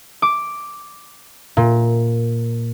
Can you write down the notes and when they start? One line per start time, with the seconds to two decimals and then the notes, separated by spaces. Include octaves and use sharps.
0.22 D6
1.57 A#2